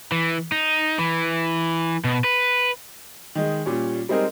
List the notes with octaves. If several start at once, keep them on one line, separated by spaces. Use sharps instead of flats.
E3
D#4
E3
B2
B4
D#3 G#3
A#2 G3 C#4
G3 G#3 C4 D#4 G#4 A#4